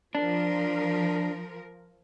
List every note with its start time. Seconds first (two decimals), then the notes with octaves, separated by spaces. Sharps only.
0.15 F3 D4 A#4